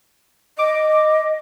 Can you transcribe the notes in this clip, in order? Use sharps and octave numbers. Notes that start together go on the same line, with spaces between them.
D#5 D6